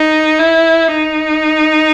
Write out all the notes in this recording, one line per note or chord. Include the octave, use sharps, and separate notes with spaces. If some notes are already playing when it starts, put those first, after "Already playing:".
Already playing: D#4
E4
D#4